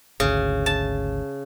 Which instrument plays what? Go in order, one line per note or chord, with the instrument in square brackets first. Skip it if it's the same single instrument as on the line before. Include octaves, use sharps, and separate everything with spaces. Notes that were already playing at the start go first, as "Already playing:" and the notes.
[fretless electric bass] G#1 D2 [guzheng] C#3
[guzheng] A5